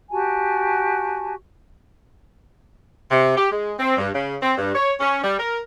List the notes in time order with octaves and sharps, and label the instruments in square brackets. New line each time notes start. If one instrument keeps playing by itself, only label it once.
[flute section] F#4 G4 G#5 A5
[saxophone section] C3
G4
G#3
C4
G2
C#3
C4
G2
C#5
C#4
G3
A#4